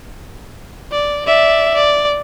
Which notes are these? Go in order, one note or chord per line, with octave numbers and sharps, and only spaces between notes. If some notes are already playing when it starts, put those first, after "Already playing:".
D5
D5 E5
D5